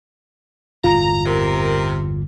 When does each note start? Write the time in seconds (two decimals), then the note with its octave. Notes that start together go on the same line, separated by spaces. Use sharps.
0.84 G1 E2 A2 F4 A#5
1.26 C3 A#4